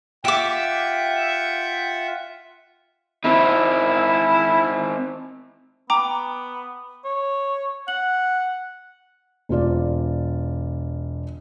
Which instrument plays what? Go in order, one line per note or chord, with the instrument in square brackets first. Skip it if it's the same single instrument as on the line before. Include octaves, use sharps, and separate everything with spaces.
[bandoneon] F4 F#5 [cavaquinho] G4 D6 [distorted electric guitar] E5 [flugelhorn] G5
[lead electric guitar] C4 D#4 [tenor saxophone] E4
[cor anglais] B3 [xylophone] G5 A#5 D6
[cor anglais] C#5
[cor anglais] F#5 [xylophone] F#7
[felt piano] E1 C4 F4 D5